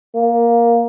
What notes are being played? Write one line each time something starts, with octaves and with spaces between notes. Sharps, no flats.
A#3